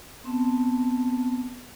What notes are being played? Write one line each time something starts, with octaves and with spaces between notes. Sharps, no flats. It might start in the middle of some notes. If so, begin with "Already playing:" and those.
B3 C4 A5